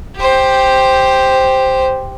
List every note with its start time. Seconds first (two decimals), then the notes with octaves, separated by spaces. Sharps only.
0.16 G4 C5